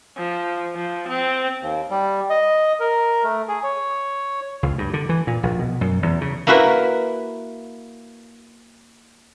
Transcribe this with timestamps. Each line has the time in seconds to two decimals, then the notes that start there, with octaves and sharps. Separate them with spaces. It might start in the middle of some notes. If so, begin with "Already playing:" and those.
0.17 F3
0.76 F3
1.08 C4
1.61 D#2
1.90 G3
2.30 D#5
2.80 A#4
3.24 A3
3.48 G#4
3.63 C#5
4.63 C#2
4.78 G2
4.94 D3
5.09 E3
5.27 A#2
5.43 A#1
5.59 B2
5.81 F#2
6.03 E2
6.21 C#3
6.47 A#3 E4 F#4 A#4 B4